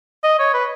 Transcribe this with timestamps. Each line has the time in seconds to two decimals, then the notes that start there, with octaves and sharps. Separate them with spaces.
0.24 D#5
0.39 C#5
0.54 B4